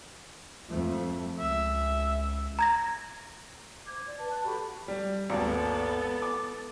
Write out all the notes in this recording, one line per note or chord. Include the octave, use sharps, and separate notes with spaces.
F2 A3
C#2 E5
A#5 G#6 A#6
C5 D6 G6 G#6
D5
B4 A5
A5 F#6
F#4 G4 A4 B5
G3
G#1 D#2 B3 A4
D6